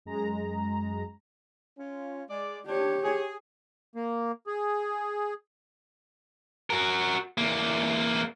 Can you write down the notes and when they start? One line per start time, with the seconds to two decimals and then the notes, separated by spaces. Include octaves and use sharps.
0.05 F#2 G#3 A#5
1.78 C#4 F4
2.29 G#3 D5
2.66 D4 G4 C#5
3.04 G#4
3.96 A#3
4.47 G#4
6.70 F#4 A#4
7.38 E2 A#3